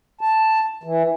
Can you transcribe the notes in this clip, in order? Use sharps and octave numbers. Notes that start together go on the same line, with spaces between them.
A5
E3